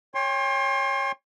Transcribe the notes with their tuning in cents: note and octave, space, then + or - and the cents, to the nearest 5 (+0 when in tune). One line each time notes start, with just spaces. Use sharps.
C#5 +0 G5 +35 C6 +30